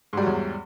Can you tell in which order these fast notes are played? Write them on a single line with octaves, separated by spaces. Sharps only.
G#2 G3 F#3 E2